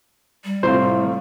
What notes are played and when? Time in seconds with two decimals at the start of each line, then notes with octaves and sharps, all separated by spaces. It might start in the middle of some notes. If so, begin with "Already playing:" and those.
0.44 G3
0.63 A2 C3 F4 C5